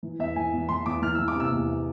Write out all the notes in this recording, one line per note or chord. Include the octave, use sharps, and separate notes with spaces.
E3
E2 E5
E3 G#5
E2
E2 C6
E2 D6
E3 F6
E3 E6
D6
C3 E6
E2